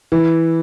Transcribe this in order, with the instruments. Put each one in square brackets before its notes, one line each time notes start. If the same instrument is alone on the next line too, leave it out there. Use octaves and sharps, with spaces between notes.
[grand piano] E3